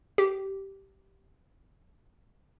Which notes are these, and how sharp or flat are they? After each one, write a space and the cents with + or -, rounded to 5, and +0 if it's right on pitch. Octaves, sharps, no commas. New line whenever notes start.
G4 -15